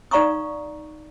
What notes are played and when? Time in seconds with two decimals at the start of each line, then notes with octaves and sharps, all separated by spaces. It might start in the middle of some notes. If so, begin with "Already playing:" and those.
0.11 D#4 D5 F5 A#5 C#6 D#6